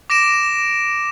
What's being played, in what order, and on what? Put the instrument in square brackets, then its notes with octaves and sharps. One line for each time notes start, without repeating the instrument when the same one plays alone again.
[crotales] D6 A#6 D7 E7